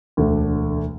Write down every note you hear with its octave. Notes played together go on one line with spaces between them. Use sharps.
E1 D2 D3 A3